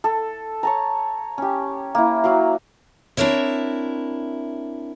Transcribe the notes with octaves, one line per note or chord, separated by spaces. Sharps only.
A4
C#5 A5 A#5
C#4 G4
A#3 E4
F#3 F#4 F5
C4 D4 E4 A#4 C#5 E5